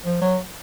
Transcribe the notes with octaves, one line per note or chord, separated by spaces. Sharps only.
F3
F#3